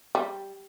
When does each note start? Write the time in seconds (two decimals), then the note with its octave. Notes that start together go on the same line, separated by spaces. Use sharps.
0.15 G3